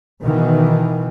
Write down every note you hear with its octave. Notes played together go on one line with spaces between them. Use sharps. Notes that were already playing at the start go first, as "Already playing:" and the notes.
B2 D#3 E3